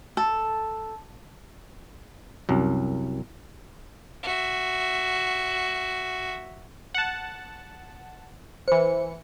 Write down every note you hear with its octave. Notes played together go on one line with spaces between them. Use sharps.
A4
C2 F#2
F#4 E5
F#5 A5
E3 C5 C#7